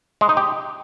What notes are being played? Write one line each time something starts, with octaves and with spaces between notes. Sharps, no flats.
G#3
D#4
G4